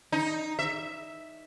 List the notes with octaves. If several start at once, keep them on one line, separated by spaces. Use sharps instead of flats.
D#4
E5